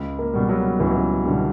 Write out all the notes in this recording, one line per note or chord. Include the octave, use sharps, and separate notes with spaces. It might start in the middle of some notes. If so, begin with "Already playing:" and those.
Already playing: C#2
A#3
B2 G3
F#3
C#2 E3
F#3
E3
B2 D3 G3